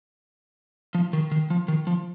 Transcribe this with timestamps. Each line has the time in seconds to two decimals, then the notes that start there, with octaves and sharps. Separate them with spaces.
0.95 F3
1.13 D#3
1.32 D#3
1.50 F3
1.68 D#3
1.87 F3